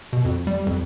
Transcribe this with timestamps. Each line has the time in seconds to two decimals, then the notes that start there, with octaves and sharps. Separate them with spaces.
0.13 B2
0.25 F2
0.47 G3
0.67 F2